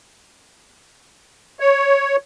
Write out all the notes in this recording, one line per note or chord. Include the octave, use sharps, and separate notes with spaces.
C#5